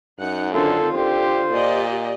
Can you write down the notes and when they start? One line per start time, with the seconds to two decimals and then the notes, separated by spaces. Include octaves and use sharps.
0.19 F#2 D#4 F#5
0.54 D3 D#3 C4 F4 A4
0.94 D3 G4 C5
1.52 A#2 G4 D5 D#5